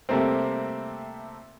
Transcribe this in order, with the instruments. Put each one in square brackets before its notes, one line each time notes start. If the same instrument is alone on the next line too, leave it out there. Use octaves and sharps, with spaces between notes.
[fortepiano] C3 G3 A3 A#3 C4